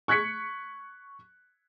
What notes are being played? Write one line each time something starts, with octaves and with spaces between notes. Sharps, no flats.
C#6 F#6 G#6 B6 C#7